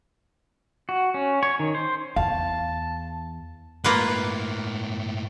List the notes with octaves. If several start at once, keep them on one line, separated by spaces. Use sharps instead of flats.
F#4
C#4
C#5
D#3
C5
E2 F5 A5
A2 G#3 A#3 F4 B4